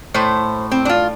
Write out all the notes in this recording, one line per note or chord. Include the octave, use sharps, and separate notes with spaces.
A2 A3 C5
C4
D4
F4